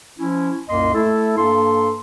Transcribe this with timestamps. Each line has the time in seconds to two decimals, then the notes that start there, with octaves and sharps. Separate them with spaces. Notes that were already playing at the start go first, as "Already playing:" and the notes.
0.19 F3 C#4 E4
0.68 C2 F#2 A#2 A#3 D#5 C6
0.94 A3 E4 A4
1.38 G2 A#3 A4 C6